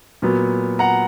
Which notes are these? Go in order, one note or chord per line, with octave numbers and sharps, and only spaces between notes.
A#2 F#3 B3
F#5 A#5